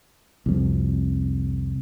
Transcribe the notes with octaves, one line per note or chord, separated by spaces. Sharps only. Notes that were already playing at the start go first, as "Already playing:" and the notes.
C2 F2